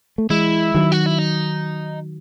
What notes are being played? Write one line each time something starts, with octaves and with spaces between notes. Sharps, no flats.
A3
E3 G#3 E4
D#3 F#3
F#4
E4
D#4